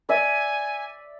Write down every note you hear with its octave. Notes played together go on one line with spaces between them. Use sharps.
D5 E5 G#5